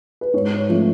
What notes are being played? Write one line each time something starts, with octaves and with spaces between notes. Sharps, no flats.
B4
G#2 C#5
C#5
F3 A3 C#4